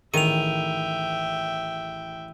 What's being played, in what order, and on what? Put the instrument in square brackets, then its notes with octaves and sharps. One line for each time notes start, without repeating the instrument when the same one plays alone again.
[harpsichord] A1 G#4 [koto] D#3 [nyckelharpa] E5 G5 [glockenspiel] D#7 F7